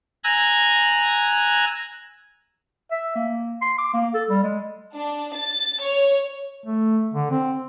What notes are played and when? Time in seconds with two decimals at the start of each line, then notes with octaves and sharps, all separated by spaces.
0.24 G#5 A#5 E6 F#6 G#6 A#6
2.91 E5
3.15 A#3
3.61 C6
3.78 D6
3.93 A#3
4.14 A4
4.29 G3
4.43 G#3
4.95 D4
5.33 A6
5.80 C#5
6.66 A3
7.14 D3
7.31 C4